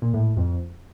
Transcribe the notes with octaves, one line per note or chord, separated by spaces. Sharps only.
A#2
A2
A2
F2